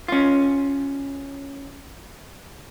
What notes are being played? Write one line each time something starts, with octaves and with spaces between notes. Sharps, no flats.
C#4 F4